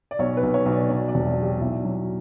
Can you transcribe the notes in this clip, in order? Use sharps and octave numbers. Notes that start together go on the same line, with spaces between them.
D5
B1 C#5
B4
B1
C#5
B1
D5
F#3 D5
D5
E1
D5
F#3
G4
B1 E4
F#3